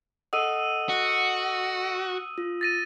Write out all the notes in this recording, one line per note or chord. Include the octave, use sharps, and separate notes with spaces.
A4 D#5 F#5 D#6 E6 D#7
F#4
F4
A6 A#6 D#7